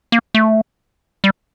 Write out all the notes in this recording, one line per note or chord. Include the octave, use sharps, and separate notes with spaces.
A#3
A3
G3